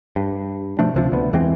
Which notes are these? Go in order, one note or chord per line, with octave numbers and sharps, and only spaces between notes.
G2
B2 F3 A3 D4
C#2 C3 F3
D2 B3
E2 E3 G#3 C4